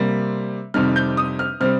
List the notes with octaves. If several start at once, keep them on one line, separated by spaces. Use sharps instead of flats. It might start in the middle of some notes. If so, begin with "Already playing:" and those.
Already playing: C3 G3 A#3
F2 C3 D#3 G3 F6
G6
D#6
F6
C3 G3 C4 F6